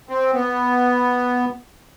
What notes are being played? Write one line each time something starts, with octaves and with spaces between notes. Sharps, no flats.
C4
B3